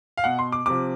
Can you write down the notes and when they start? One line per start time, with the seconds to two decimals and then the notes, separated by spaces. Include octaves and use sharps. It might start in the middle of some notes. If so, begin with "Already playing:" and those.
0.17 F5
0.24 B2 F#5
0.39 C6
0.52 D6
0.66 C3 F3 D6